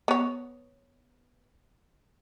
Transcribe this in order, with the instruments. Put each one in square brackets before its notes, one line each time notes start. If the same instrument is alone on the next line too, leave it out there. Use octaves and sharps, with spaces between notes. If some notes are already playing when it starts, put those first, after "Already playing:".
[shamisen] B3 C#5